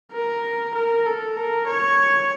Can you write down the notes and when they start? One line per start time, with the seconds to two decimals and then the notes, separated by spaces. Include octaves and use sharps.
0.13 A#4
0.75 A#4
1.06 A4
1.37 A#4
1.68 C#5